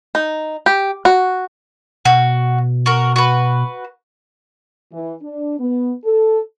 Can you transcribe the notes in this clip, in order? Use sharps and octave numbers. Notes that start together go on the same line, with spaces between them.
D#4
G4
F#4
B2 F#4
F#4 A#4
F#4 B4
E3
D4
B3
A4